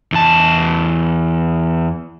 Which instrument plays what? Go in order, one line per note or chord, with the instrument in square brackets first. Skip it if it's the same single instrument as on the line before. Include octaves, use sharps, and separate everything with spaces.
[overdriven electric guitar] E2 A5